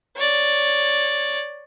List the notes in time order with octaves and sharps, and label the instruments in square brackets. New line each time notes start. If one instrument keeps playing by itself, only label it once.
[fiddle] C#5 D5